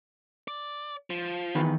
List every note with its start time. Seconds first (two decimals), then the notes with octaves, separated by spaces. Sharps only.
0.48 D5
1.10 F3
1.55 E2 D#3 B4